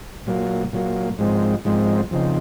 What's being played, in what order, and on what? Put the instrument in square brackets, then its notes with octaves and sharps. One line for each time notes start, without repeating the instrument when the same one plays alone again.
[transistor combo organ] A#2 F#3 A#3
A#2 F#3 A#3
G#2 F3 G#3 C4
G#2 F3 G#3 C4
F2 C#3 F3 C4 D#4